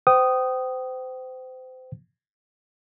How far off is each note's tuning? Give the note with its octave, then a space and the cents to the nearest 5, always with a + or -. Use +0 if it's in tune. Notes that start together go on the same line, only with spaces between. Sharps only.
C5 -30 G5 -30 D#6 -5